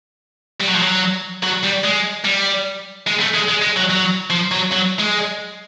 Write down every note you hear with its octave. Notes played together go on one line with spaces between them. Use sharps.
G3
F#3
F3
F#3
F#3
G3
G#3
G3
G#3
A3
G#3
G#3
G#3
F#3
F#3
F3
F#3
F#3
G#3